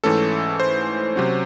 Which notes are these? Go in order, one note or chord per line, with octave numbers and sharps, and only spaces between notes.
G#2 E3 A3 C#4 A4
C5
C3 F#3 C#4